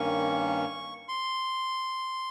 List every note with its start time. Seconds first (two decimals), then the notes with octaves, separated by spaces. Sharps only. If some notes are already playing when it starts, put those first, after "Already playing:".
Already playing: G2 D#3 A#3 C#4 C#6
1.09 C6